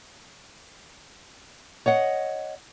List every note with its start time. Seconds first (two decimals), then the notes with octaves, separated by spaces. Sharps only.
1.86 C#5 D#5 F#5